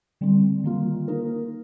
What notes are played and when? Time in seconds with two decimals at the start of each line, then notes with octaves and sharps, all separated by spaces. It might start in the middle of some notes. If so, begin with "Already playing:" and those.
0.21 D3 G3 C4
0.64 D#3 G3 A#3 F4
1.08 A#3 D#4 A#4